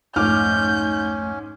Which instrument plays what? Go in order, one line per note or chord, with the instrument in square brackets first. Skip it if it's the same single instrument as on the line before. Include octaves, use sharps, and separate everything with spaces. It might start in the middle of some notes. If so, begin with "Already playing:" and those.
[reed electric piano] C2 F2 A3 [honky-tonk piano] G#2 D6 F6 [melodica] C#4 [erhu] G6